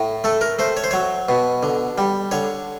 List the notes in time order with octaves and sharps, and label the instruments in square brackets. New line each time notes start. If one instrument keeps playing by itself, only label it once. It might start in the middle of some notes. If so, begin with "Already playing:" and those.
Already playing: [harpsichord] A2
A3 A4
A#4
A3 C5
C#5
C5
F#3 C#5
B2
D3
G3
D3 C#5